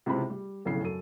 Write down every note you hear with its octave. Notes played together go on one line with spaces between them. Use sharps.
C#2 C3 E3 C4 B5
G3
F1 B1 A2 C#3 C7
F#2 A4 D#7